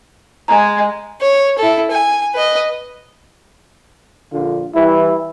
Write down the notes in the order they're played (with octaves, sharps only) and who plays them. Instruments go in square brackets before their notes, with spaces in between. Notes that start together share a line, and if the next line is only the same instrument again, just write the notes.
[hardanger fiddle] G#3 [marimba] G#5 A#5
[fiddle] C#5
E4 A4
G#5
B4 D#5
[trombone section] A#1 D3 F4
E3 G3 E4